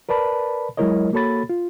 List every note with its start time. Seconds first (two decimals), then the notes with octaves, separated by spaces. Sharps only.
0.09 A#4 B4 D5 A5 B5
0.77 F#3 G#3 E4 A#4 C#5 D#5
1.13 A#3 F#4 A4 C#5 B5 A6
1.49 F4